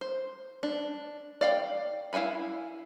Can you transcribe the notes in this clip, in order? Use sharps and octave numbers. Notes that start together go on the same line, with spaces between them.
C5
D4
D5 F5 G5
E4 F5 G5 G#5 B5